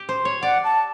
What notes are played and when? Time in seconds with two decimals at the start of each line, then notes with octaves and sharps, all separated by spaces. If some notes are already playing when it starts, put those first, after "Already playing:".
Already playing: G4
0.09 C5
0.25 C#5
0.42 D5 F#5
0.64 A5